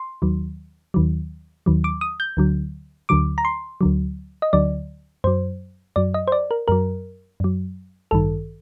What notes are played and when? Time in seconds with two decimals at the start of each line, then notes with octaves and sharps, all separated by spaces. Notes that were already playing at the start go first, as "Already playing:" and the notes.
Already playing: C6
0.22 D#2 D#3 F#3
0.94 D#2 D#3 F#3
1.66 D#2 D#3 F#3
1.84 D6
2.01 D#6
2.20 G6
2.37 D2 D3 F#3
3.09 D2 D3 F#3 D6
3.38 A#5
3.45 C6
3.81 D2 D3 F#3
4.42 D#5
4.53 D2 D3 F#3 D5
5.24 F#2 F#3 C5
5.96 F#2 F#3 D5
6.14 D#5
6.28 C5
6.32 D5
6.51 A#4
6.68 F#2 F#3 A#4
7.40 F#2 F#3
8.11 A1 G2 D#3 A4